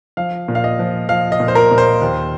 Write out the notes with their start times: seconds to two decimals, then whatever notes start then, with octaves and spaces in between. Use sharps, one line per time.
0.17 F3 F5
0.48 A#2
0.55 F5
0.64 D#5
0.79 F3
1.09 F3 F5
1.32 D#5
1.40 A#2
1.48 C5
1.55 A#4
1.71 A#2
1.78 C5
2.01 D#2